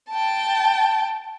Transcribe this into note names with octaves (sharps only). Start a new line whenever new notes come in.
G5 A5